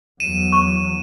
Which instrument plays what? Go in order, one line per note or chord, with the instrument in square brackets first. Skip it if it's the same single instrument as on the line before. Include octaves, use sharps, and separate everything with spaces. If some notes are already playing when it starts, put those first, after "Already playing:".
[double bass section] E2 F#3 [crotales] D#7 E7
[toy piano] C#6